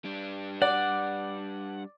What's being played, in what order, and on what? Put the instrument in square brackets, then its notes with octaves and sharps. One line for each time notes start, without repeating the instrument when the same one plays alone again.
[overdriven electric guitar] G3 D4
[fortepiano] D5 [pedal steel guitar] F#5